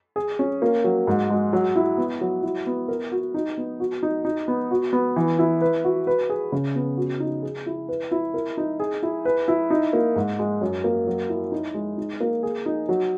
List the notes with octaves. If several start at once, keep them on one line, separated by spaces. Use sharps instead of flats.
G#4
C#4
A#3
F#3
G#2
G#3
F#3
E4
B3
F#3
E4
B3
A#4
F#4
D#4
B3
F#4
D#4
D#4
B3
F#4
B3
E3
E4
B4
F#4
B4
G#4
C#3
B3
F#4
D#4
G#4
E4
B4
E4
A#4
D#4
G#4
E4
B4
E4
D#4
A#3
G#2
G#3
F#2
A#3
F#3
E4
D#4
G#3
D#4
A#3
G#4
D#4
F#3